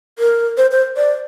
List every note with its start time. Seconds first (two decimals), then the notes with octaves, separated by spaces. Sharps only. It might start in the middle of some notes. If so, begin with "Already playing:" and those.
0.19 A#4
0.58 C5
0.71 C5
0.97 D5